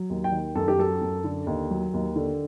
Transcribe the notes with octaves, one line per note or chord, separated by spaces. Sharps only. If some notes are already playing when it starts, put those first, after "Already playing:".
Already playing: F#3
D#2
G5
D#3
F#2 A4
G4
F#3 A4
F#2
D3
D#2
F#3
D#2
D3